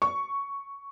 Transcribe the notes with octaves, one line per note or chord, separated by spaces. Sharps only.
C#6